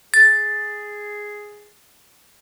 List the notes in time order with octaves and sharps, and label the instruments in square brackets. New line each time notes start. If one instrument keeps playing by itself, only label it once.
[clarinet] G#4 [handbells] A6